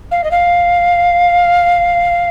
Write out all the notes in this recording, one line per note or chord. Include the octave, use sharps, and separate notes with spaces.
F5
D#5
F5